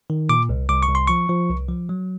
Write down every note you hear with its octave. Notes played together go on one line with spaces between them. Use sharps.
D#3
A#2 D6
C2
C2 D6
C#6
C2
C6
F3 C#6
F3
C2
F3
F#3